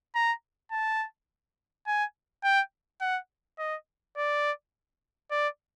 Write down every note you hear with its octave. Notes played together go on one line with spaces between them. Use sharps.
A#5
A5
G#5
G5
F#5
D#5
D5
D5